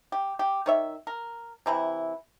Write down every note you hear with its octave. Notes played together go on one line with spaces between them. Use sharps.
G4
G4
D#3 C#5 E5
A#4
C3 E3 E4